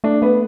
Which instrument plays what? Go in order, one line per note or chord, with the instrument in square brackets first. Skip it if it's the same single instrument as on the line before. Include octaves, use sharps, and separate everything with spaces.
[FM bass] A3 [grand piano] D4
[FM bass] A3 [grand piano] B3